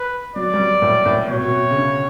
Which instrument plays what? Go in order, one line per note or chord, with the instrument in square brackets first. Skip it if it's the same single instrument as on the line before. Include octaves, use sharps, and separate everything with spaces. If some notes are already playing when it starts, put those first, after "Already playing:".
Already playing: [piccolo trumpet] B4
[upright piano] F#3 [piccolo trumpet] D5
[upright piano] G3
F#3
A2
A2
[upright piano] B2 [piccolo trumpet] C#5
[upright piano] B2
B2
C#3
D3